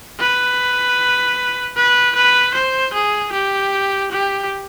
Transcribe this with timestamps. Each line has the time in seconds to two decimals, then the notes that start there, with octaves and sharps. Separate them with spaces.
0.20 B4
1.77 B4
2.15 B4
2.54 C5
2.93 G#4
3.32 G4
4.11 G4